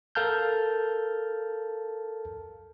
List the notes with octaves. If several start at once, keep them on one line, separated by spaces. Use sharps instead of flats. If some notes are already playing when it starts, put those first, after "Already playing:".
A4 A#4 F5 A5 F6 G6